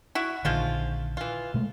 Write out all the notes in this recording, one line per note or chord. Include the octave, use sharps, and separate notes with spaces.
E4 F#4
A#1 D3 D#3 F3 G#3 F4
E3 F4
B2 G#3 A3